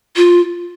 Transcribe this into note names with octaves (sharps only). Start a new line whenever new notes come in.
F4